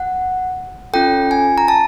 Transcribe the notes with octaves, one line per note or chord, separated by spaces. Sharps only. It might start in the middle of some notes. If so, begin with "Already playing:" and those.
Already playing: F#5
C#4 F4 A4 G5
G#5
A#5
A5